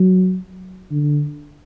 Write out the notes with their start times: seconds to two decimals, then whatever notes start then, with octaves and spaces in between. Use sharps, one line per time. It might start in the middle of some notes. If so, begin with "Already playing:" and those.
Already playing: F#3
0.91 D3